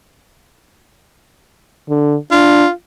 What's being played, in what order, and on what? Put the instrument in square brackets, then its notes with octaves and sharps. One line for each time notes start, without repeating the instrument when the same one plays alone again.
[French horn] D3
[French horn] D4 [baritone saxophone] F4